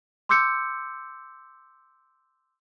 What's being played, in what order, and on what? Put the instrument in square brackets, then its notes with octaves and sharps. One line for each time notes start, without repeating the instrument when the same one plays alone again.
[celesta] C6 D6 E6 G6 C#7